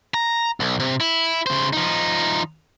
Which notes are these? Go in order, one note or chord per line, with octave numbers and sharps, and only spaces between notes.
A#5
B1
C3
E4
C#3 C5
F3 D#4